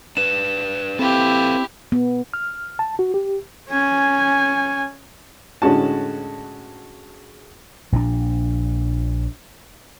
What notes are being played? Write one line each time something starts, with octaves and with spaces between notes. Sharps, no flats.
D4 B4 E7
C4 E4 G4 A4 B4 F5
B3
F6
A5
F#4
G4
C#4 G#5
A2 D3 G#3 C#4 F#4 A5
A#1 A#2 D#3 D4